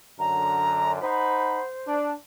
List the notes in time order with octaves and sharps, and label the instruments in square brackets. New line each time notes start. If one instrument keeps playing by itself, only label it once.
[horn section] F#2 D3 [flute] A#5
[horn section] D#4 F#5 B5 [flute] C5
[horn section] D4